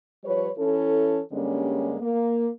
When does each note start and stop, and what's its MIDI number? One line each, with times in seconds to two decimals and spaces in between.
0.24 0.48 53
0.24 0.48 55
0.24 0.48 71
0.24 0.48 73
0.58 1.21 52
0.58 1.21 61
0.58 1.21 64
0.58 1.21 69
1.32 1.96 43
1.32 1.96 50
1.32 1.96 55
1.32 1.96 56
1.32 1.96 58
1.32 1.96 61
2.01 2.49 58